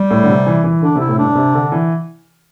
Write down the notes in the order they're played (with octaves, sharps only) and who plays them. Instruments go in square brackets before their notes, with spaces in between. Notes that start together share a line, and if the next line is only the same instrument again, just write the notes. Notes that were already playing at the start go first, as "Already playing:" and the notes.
Already playing: [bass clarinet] G3
[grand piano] A2
D3
C3
E3
E3
[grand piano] D3 [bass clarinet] D4
[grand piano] C3 [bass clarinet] E4
[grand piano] A2
[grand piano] G2 [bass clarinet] D4
[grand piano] C3
D3
E3